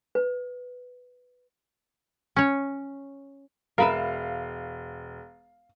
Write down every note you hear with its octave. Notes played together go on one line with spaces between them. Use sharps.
B4
C#4 C#5
E1 A#4 B4 E5 F5